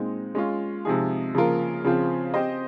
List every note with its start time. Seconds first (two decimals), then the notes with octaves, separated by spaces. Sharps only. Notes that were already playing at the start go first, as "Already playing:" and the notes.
Already playing: A#2 G#3 C4 D#4
0.35 G#3 C#4 F4
0.85 C3 F3 G#3 D#4 G#4
1.34 C#3 F3 A#3 F4 A#4
1.84 C#3 F3 C4 F4
2.34 C4 G4 C5 D#5